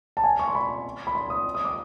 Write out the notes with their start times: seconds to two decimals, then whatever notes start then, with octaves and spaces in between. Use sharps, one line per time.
0.17 A5
0.24 G#5
0.39 C#6
0.48 C6
0.55 B5
1.07 B5
1.15 C6
1.30 D#6
1.55 D#6
1.65 D6